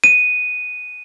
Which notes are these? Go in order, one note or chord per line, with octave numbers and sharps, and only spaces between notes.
D#7